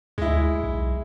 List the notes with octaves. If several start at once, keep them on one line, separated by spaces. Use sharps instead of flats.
D2 G#3 E4
B1